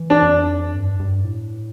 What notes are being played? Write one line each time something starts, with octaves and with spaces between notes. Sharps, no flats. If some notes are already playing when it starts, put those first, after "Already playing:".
Already playing: E3
D4
F2
G2
G2
A2